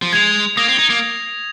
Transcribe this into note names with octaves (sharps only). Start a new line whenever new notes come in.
F3
G#3 G#6 F7
A#3 D#6 A#6 F7
C4
D#4
A#3